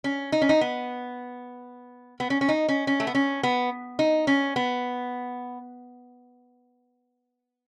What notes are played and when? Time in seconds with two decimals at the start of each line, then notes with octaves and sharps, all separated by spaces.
0.04 C#4
0.32 D#4
0.42 C#4
0.49 D#4
0.61 B3
2.20 B3
2.30 C#4
2.41 C#4
2.49 D#4
2.69 C#4
2.87 C#4
3.00 A3
3.07 B3
3.15 C#4
3.43 B3
3.99 D#4
4.27 C#4
4.56 B3